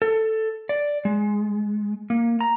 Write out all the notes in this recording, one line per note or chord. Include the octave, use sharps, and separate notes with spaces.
A4
D5
G#3
A#3
A#5